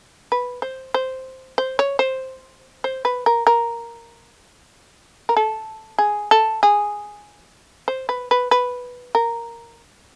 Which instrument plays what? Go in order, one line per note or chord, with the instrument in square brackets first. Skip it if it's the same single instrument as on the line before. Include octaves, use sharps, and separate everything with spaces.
[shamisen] B4
C5
C5
C5
C#5
C5
C5
B4
A#4
A#4
A#4
A4
G#4
A4
G#4
C5
B4
B4
B4
A#4